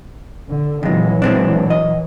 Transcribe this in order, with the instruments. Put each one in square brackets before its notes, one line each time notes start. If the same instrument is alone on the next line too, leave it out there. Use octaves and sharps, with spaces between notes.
[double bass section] D3
[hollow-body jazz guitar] F2 G#3 [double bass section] A#2 E3 F#3
[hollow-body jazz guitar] G#3 C4 D4
D#5